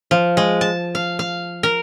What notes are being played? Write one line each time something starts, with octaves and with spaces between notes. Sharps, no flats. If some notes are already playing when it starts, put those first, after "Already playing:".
F3
G#3
A5
F5
F5
A#4